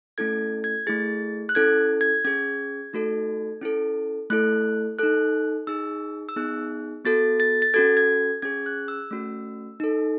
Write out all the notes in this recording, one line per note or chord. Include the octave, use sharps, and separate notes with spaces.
A3 C#4 E4 A4 G#6
G#6
A3 E4 G#4 A6
F#6
C#4 E4 A4 G#6
G#6
C#4 G#4 G#6
A3 D#4 F#4 A4
C#4 E4 A4
A3 E4 A4 F#6
D#4 A4 F#6
D#4 G#4 E6
E6
B3 D#4 G#4 F#6
B3 F#4 A4 A6
A6
A6
C#4 F#4 A4 G#6
G#6
C#4 G#4 G#6
F#6
E6
A3 C#4 F#4
D#4 A4